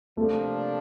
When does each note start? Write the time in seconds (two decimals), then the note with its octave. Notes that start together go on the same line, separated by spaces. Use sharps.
0.17 C3 F3 A3 A#3 D4